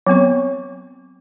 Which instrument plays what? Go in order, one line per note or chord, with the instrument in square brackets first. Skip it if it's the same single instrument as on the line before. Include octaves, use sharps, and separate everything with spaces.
[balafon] F#3 B3 C4 C#6